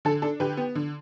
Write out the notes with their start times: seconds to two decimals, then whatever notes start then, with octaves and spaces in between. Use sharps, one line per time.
0.05 D3 A4
0.22 D4 A4
0.40 D3 G4 B4
0.57 B3
0.75 D3